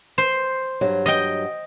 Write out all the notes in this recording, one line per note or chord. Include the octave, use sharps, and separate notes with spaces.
C5
G2 F#3
D#5 G5